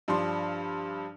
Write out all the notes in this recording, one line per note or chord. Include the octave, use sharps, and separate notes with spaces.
G2 F3 D4 C6